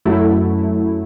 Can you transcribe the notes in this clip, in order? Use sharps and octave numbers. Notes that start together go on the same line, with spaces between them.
F#2 F#3 A3 E4